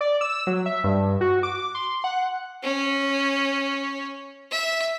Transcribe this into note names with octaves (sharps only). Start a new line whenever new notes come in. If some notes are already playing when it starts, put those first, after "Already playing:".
D5
E6
F#3
E5
G2
F#4
D6
C6
F#5
C#4
E5